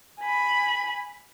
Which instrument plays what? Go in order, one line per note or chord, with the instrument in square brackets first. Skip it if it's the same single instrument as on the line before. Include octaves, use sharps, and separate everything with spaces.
[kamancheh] G#5 B5